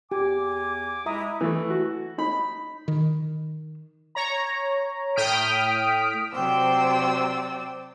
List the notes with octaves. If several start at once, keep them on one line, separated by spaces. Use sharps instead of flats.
E2 G4 G#5 D6
G#3 E4 E5 A#5 D#6
E3 A3
F#4
D#4 B5
D#3
C#5 A#5
A2 G5 D#6 F6 B6 D7
C3 F#3 C5 D5 G5 E6